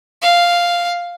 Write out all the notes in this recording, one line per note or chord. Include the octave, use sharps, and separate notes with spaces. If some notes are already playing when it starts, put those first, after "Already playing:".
F5